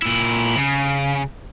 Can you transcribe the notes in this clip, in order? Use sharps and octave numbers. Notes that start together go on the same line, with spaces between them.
A#2 E4
C#3